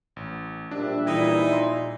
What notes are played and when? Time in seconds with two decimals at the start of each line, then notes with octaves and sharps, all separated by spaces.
0.16 A1
0.71 A#1 G3 D4 E5
1.06 A#2 E3 D#4 E4 D#6
1.53 C6